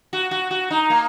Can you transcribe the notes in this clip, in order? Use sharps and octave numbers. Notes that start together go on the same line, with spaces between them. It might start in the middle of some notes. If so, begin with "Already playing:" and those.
F#4
F#4
F#4
D#4
A#3